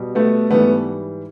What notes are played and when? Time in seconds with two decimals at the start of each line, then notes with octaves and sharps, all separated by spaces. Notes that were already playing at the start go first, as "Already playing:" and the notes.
Already playing: B2 G3
0.15 A3 B3
0.51 G#2 E3 G3 A3 B3